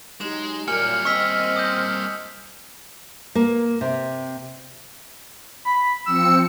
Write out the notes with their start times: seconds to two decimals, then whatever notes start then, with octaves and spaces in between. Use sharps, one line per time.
0.21 F#3 G#3 D#4 G4 E7
0.68 F#2 A#2 G3 A#3 G#5 F6 C#7
1.05 C4 D#5 C#6 E6 B6
1.56 D#6 G6
3.35 A#3
3.81 C3
5.65 B5
6.06 F3 C4 E6 C#7